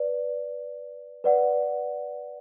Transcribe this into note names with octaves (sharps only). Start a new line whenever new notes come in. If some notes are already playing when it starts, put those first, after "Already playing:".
Already playing: B4 D5
B4 D5 F#5